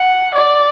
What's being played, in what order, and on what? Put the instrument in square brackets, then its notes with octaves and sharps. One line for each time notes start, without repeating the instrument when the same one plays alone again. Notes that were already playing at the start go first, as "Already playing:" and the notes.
Already playing: [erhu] F#5
D5